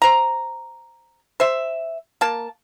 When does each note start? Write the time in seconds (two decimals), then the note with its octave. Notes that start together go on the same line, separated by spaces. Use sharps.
0.02 C5 A#5
1.40 C5 E5
2.21 A#3 A5